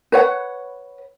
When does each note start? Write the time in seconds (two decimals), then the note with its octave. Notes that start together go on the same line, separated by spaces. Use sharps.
0.12 B4 C#5 F#5